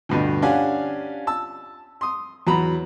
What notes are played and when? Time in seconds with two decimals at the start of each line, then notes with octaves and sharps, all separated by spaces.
0.09 D2 G2 B2
0.42 C#4 D4 G4 F5 F#5 G#5
1.27 A5 E6
2.01 C6 D#6
2.47 E2 F#3 A#5 B5